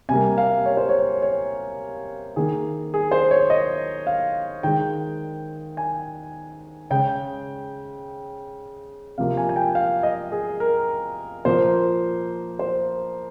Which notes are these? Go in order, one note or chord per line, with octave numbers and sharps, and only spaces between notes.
C3 G3 A#3 G#5
F5
C#5
C5
C#5
C#5
D#3 A#3 G#4
G#4
C5
C#5
D#5
F5
D#3 G#3 G5
G#5
C#3 G#3 G5
C3 F3 A#3 F5
G#5
G#5
G5
F5
D#5
G#4
A#4
A#2 F3 A#3 C5
C5